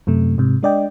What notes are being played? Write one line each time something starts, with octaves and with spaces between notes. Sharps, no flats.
F#2 C3 A3
G#2 C3
G#3 D4 D5 D#5 G5